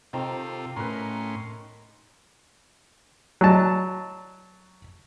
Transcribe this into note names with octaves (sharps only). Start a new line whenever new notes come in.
C3 D#3 C4 F4 A4 A#5
A2 C#4 A#4 B4 C6
F#3 A5